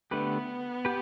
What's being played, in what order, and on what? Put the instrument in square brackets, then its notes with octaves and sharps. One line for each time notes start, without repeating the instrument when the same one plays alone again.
[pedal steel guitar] D3 A3 D4 G4 B4 [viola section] B3
[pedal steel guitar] G4 B4